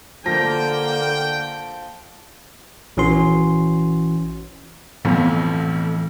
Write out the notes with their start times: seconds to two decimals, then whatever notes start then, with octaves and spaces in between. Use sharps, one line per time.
0.25 D3 F3 A#3 G5 A#6
2.97 A#1 E3 C#4 F#4 C6
5.05 B1 F2 A2 E3 F4